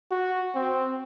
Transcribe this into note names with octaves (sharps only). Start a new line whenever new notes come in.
F#4
C4